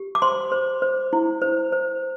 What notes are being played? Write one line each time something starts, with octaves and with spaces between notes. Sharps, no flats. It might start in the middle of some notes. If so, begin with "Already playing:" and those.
Already playing: G4
D6
C5 C6
C5
C5
E4
C5
C5